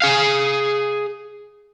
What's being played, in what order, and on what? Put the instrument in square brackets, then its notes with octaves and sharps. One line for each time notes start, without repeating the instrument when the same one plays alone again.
[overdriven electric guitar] G#4 F5